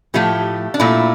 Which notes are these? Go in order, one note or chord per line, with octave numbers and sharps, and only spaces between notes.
A2 F3 A3 G4
D4
A#2 A3 E4